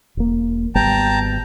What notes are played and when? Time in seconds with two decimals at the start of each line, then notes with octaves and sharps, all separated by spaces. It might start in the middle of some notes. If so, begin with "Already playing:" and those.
0.17 E1 A#3
0.75 G#1 G3 B3 G5 A5 A#5